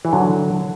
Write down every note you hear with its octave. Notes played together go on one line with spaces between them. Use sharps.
E3
D3 F#3